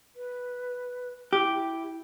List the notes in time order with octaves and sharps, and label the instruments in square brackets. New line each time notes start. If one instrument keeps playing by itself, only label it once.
[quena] B4
[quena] E4 [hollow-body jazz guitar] G4